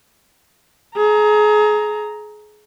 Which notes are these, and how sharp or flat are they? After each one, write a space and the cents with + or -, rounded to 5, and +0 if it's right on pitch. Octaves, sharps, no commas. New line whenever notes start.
G#4 +30 A#5 +0